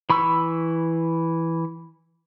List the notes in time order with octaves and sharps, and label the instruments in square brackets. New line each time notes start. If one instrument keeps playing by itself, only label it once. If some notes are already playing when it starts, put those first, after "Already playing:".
[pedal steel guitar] E3 B5 C#6 E6